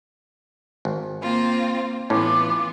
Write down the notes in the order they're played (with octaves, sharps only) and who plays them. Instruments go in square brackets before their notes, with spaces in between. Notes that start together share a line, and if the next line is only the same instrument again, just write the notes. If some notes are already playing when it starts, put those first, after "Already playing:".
[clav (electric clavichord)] G#1
[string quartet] A#3 C4 F4
[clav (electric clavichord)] A2 C#4 [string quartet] E3 B3 F4 [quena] D6